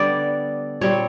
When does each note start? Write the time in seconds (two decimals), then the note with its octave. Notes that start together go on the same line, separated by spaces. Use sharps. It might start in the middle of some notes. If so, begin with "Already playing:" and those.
Already playing: D3 G3 B3 D5
0.81 A#2 G3 C4 C#5